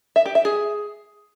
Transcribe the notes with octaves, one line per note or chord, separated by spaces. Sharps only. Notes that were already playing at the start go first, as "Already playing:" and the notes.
E5
G4
E5
G#4